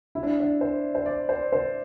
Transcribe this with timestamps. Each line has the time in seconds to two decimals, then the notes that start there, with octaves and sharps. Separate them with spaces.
0.15 E4
0.23 D4
0.40 D4
0.61 C5
0.95 C5
1.06 D5
1.29 C5
1.53 C5